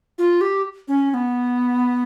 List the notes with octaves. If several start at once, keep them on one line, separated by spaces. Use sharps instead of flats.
F4
G4
C#4
C#4
B3